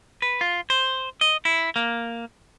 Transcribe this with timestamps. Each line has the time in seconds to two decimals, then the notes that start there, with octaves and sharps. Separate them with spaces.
0.22 B4
0.41 F4
0.70 C5
1.21 D#5
1.45 E4
1.76 A#3